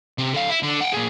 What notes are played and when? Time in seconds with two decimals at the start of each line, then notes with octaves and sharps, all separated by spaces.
0.18 C3
0.34 D3 F5
0.50 E4
0.63 D3
0.81 F#5 G5
0.93 A#2 G#4